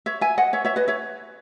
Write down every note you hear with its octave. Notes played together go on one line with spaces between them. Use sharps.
C#5 E5
E5 G#5
D#5 F#5
C#5 E5
C#5 E5
B4 D#5
C#5 E5